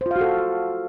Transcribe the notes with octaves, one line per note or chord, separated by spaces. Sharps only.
F4 F#4 A4 C5 F5